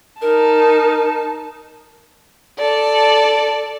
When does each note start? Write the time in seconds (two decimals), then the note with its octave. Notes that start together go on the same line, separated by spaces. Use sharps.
0.22 D#4 A#4 A5
2.58 A4 D5